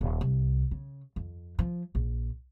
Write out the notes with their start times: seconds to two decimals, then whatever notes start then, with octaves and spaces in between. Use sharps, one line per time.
0.01 D#1
0.21 C2
0.71 C#3
1.16 F2
1.59 F3
1.95 A#1